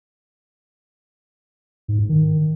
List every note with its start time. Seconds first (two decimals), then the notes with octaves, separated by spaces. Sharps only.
1.88 G#2
1.99 G#2
2.09 D#3